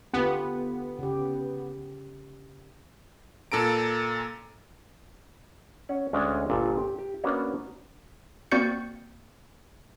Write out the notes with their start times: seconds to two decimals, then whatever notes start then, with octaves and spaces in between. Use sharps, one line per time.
0.14 D3 B3 F4 G4
0.99 C#3 G4
3.52 A#2 A4 A#5 D7
5.89 C#4 F#5
6.13 D2 G#3 C#4 D4 C#5
6.50 G1 A#2 A5
6.78 G4
6.99 G4
7.24 A#3 B3 C#4 D4 F#4 C#5
8.52 A#3 C4 F#4 D5 G6 C#7